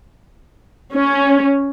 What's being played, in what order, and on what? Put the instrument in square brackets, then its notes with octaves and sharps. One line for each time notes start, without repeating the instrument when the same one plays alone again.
[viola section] C#4